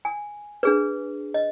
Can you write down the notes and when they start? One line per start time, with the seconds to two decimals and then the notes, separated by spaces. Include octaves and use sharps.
0.05 G#5
0.63 D4 G#4 B4
1.34 D#5